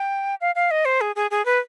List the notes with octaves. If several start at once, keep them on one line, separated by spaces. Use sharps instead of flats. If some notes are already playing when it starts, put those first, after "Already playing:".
Already playing: G5
F5
F5
D#5
C5
G#4
G#4
G#4
B4